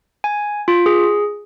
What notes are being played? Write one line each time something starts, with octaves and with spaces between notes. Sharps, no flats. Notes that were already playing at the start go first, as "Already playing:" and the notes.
G#5
F4
G#4